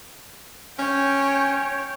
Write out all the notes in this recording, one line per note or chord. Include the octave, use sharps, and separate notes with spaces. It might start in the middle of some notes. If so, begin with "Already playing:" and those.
C#4 C#5 G5